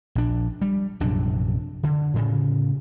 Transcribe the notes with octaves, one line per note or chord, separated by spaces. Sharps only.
A#1 D4
G3
A#1 F#2 C3 D4
D3
A2 C#3